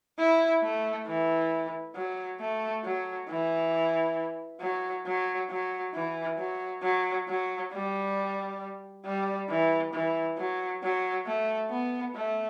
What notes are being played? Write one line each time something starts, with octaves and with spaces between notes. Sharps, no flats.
E4
A3
E3
F#3
A3
F#3
E3
F#3
F#3
F#3
E3
F#3
F#3
F#3
G3
G3
E3
E3
F#3
F#3
A3
B3
A3